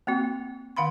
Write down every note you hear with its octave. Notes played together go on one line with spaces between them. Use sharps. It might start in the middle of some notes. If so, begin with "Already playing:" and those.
A#3 C4 F#4
D#3 F5 F#5 B5 C6